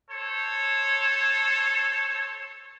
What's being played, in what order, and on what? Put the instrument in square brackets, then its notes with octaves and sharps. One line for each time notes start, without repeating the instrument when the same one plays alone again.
[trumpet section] A4 C5 C#5